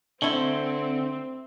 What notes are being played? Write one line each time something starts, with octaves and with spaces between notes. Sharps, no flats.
D3 A3 C4 E4